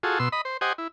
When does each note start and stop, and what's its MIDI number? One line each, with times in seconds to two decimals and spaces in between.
0.03 0.19 65
0.03 0.19 66
0.03 0.19 68
0.03 0.19 69
0.19 0.29 47
0.19 0.29 84
0.19 0.29 88
0.32 0.41 75
0.32 0.41 83
0.45 0.57 72
0.61 0.73 67
0.61 0.73 72
0.61 0.73 75
0.61 0.73 78
0.61 0.73 80
0.78 0.88 64